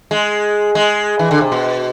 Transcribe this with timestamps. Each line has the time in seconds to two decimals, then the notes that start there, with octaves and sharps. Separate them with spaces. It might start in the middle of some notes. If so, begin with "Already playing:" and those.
0.11 G#3
0.75 G#3
1.19 E3
1.31 D3
1.41 C3
1.52 B2